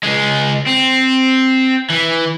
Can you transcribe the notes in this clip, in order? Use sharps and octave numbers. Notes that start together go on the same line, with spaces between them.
C#2 G#3
C4
E3